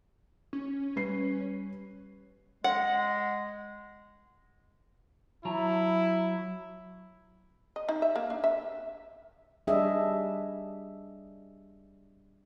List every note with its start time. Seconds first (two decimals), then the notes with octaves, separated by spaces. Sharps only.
0.53 C#4
0.96 G3 B4 C7
2.64 G#3 F#5
5.45 F#3 E4 A5 A#5
7.76 D#5
7.89 D#4
8.02 E5
8.16 A#3
8.30 D4
8.44 E5
9.67 G3 D4 G#4 D#5 E5